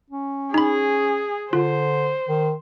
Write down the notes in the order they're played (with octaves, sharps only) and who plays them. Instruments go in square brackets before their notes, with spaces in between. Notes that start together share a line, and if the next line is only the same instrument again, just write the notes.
[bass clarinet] C#4
[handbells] D#4 B5 [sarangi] G#4
[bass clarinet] D3 [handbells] F4 [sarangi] C5
[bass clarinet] D#3